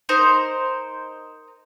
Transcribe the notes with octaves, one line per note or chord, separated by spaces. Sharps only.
D#4 A#4 C5